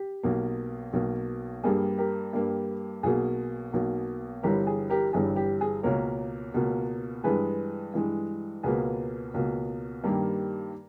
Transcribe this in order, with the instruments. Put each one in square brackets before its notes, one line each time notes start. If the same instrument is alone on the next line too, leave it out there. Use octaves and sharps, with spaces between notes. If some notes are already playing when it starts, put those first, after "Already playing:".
Already playing: [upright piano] G4
B1 B2 A#3
B1 B2 A#3
G2 G3 A#3 G#4
G4 A#4
G2 G3 A#3
B1 B2 A#3 G#4
B1 B2 A#3
G1 G2 E3 G3 G4 A#4
G#4
G4 A#4
G1 G2 E3 G3 G#4
G4
G#4
C#2 B2 A#3 A#4 C#5
C#2 B2 A#3
G2 E3 G#3 G#4 B4
G2 E3 G#3
C#2 B2 A#3 G#4 B4
C#2 B2 A#3
G2 D#3 G3 A#3 G4 A#4